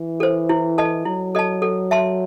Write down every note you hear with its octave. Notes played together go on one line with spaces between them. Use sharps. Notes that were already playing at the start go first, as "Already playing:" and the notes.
Already playing: E3
A4 C5
E4
A4 D#5 A5
F#3 E4
A4 D#5 A5
A4
E5 A5 C6